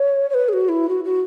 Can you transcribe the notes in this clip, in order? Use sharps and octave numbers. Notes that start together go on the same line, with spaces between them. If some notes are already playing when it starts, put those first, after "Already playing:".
Already playing: C#5
C#5
B4
G#4
F#4
E4
F#4
F#4